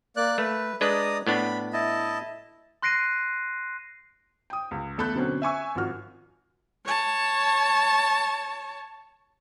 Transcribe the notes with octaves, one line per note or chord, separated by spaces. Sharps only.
A#3 D5 F#6
A3 B4
G#3 D4 B4 D5 A#5 D#6
A2 B3 D4 B5
E4 D#5 A5
C6 F#6 A#6 C7 D7 D#7
G5 D#6
C#2
E2 A3 A4 B5 F#6 G6
B2 D3 F#3 C4 C#4
E5 G#5 C#6 E6
G#1 D#3 F3 F#4 F6
C#5 A5